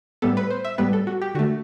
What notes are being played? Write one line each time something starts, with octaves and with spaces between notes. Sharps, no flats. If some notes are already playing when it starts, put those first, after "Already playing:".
A2 G3 B3 A4
B4
C5
E5
A2 G3 B3 B4
A4
F#4
G4
D3 A3 F#4